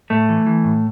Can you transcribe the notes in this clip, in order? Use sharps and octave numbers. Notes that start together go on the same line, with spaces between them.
A2 A3
E3
E3
A2